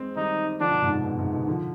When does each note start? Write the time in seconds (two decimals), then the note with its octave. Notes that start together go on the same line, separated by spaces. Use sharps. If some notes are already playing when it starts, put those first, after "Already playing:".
Already playing: G#3 C4
0.16 D#3 G3 D#4
0.60 D3 F3 D4
0.71 B2 D3
0.82 G#2 C3
0.93 G#2
1.04 B2
1.19 G#2 C3
1.33 B2 D3
1.47 D3 F3